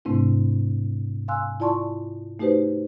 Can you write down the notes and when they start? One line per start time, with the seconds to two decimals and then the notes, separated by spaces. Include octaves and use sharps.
0.05 G#2 C3 A3 C4 D4 E4
1.28 F5 G#5 C6 E6 F#6
1.60 E4 F4 D5 A5 C6 C#6
2.39 A3 D#4 F#4 G4 B4 C5